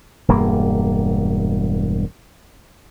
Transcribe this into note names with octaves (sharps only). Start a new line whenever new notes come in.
E1 G2 A#3